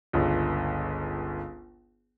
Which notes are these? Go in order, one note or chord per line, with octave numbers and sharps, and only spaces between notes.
G1 C#2